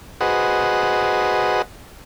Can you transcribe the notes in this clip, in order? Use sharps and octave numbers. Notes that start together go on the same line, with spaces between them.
F#4 G#4 B4 C5 D#5 F#5